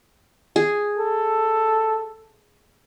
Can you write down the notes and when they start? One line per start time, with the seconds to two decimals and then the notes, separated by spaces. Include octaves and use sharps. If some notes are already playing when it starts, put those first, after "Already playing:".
0.56 G#4
0.98 A4